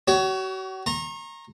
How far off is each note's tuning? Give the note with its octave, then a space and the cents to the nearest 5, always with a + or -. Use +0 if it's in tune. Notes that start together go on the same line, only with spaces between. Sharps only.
F#4 +40 C#5 +20
A#5 +0 C#6 -45